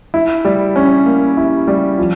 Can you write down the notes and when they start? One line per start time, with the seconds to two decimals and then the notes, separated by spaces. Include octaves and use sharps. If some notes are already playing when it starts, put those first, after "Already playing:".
0.14 E4
0.45 G3
0.76 C#4
1.06 A#3
1.37 E4
1.67 G3
1.98 F3